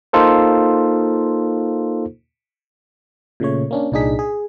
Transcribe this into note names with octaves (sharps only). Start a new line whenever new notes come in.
A#3 D#4 F4 A4 C5
A#2 C#3 A3 C#5
A#3 C#4 D4
C2 A#2 D4 D#4 G#4 B6
G#4